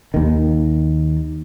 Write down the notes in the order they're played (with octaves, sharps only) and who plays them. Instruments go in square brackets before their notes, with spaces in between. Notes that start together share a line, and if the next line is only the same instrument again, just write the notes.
[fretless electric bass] D#2 D#3